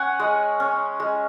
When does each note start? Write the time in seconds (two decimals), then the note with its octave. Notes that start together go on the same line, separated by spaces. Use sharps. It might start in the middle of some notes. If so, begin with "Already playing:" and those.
Already playing: C#4 F#5 G#5
0.19 G#3
0.60 C#4
1.00 G#3